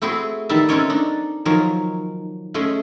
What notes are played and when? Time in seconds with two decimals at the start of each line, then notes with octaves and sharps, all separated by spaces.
0.02 A3 C4 E4 F#4 G#4
0.49 D#3 E3 G3 D#4 E5 A5
0.69 C4 C#4 A4 A#4 C#5 D#5
0.90 D4 D#4
1.45 D#3 F3 F#3 D#4 A#4 C#5
2.54 A3 C#4 G#4 D#5